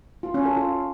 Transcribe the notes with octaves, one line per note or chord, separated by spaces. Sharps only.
F4
C#4
A4
F4